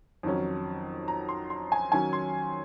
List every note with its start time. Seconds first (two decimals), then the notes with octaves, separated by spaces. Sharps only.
0.23 F2 D#3 F#3 C#4
1.08 A#5
1.29 C6
1.50 C6
1.72 G#5
1.92 D#3 F#3 C#4 G#5
2.13 C6